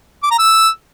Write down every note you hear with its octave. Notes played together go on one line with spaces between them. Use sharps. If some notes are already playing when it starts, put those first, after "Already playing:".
D6
A#5
E6